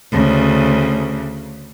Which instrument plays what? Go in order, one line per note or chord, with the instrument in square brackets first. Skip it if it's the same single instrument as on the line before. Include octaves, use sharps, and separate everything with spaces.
[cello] D2 C#3